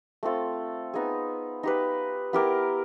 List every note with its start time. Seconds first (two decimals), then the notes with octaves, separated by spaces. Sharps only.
0.23 A3 C4 F4 A4
0.94 B3 D#4 G#4
1.63 D#4 G4 B4
2.33 B3 E4 G4 A#4